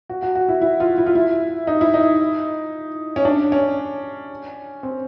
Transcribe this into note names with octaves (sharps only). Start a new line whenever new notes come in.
F#4
F#4
F#4
E4
E4
F4
E4
F4
E4
D#4
E4
D#4
C#4
D4
C#4
C4